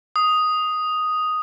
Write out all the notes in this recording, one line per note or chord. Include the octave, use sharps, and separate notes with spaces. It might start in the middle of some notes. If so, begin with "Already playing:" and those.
D#6